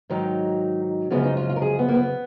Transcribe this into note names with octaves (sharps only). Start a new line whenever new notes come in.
G#2 D#3 F#3 D#4
F#2 C#3 F3 G#3 B3
D#4
F4
F4
A#4
G#4
B3
A#3
B3